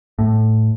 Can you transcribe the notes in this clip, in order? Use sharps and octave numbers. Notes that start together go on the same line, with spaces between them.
A2